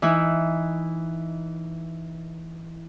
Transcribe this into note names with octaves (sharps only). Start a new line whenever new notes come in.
E3 D#4 E4